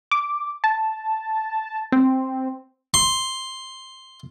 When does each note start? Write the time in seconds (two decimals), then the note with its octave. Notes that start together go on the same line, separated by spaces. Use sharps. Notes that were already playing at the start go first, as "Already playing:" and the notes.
0.11 D6
0.64 A5
1.92 C4
2.94 C6